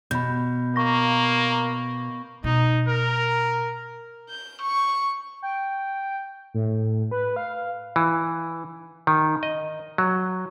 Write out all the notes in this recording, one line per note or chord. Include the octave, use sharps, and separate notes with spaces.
B2 B5 G6
A#3 C#6 A#6
B2 D#4
A#4
G6
C#6
G5
A2
B4
F5
E3
D#3
D#5
F#3